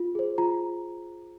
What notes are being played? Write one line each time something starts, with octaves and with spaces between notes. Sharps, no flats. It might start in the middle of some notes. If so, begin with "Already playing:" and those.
Already playing: F4
G#4 C5
F4 A#5